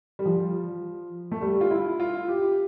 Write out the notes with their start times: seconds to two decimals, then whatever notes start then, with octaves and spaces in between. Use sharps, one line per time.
0.19 G3
0.26 F3
1.32 A3
1.42 G3
1.61 F4
1.71 E4
2.00 F4
2.28 G4